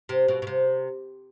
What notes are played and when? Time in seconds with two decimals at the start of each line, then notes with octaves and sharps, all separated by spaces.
0.09 C3
0.28 B2
0.42 B2
0.47 C3